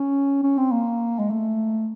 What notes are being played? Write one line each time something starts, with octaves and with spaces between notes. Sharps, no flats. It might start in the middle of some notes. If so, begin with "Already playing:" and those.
Already playing: C#4
C#4
C4
A#3
G#3
A3